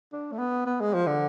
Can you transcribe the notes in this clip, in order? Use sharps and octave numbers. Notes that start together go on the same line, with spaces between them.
D4
A3
B3
B3
G#3
F3
D3